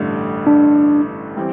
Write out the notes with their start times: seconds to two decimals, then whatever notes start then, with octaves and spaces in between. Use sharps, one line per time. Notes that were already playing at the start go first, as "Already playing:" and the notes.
Already playing: A1 G2 D3 A3
0.47 D4
1.37 E3 G3 C4